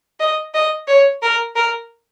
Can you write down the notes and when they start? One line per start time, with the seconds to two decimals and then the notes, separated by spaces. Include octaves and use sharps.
0.20 D#5
0.54 D#5
0.88 C#5
1.22 A#4
1.55 A#4